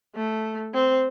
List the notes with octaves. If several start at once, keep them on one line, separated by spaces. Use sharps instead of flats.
A3
C4